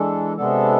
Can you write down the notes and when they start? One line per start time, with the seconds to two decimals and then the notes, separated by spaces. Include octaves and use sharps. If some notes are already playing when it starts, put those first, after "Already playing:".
Already playing: E3 G#3 D4 A4
0.37 C3 G#3 B3 D4 A4